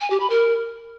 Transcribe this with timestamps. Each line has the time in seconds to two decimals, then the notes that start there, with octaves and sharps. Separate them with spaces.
0.01 G#5
0.10 G4
0.20 B5
0.30 A#4